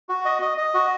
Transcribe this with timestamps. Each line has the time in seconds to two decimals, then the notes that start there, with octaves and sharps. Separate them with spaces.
0.09 F#4
0.25 D#5
0.42 D#5
0.57 D#5
0.74 F#4